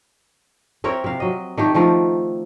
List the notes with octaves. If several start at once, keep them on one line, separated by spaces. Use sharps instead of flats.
C4 E4 A#4 C#5
C3 F5
F#3 D#5
D#3 A3 G4
D#3 F3 A3 A#4